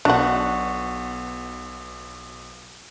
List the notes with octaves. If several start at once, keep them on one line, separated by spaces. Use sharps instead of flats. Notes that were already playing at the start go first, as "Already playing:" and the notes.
B1 B2 D4 F#4 F#5